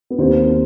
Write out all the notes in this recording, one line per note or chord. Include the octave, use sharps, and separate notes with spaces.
B3
D#2 C4